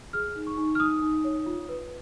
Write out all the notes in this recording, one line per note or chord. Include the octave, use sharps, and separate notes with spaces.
G#4 F6
D#4
C#6
D#4
F6
D#4 D#6
D#4
C#5
F4
B4